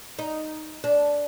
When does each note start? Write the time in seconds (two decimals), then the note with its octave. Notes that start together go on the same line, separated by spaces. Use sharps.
0.19 D#4
0.84 D4